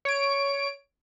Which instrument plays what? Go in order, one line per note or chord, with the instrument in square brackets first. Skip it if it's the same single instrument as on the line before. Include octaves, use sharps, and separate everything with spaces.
[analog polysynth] C#5 D7